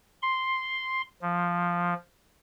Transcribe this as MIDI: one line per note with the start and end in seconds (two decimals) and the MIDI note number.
0.23 1.02 84
1.22 1.94 53